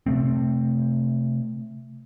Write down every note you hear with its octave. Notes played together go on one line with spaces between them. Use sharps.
C3 A3 C4